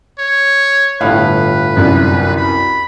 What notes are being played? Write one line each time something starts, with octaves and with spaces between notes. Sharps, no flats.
C#5
G1 A2 B4 F5
C2 F#2
B5